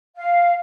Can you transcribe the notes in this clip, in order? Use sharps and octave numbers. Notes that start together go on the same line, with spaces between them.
F5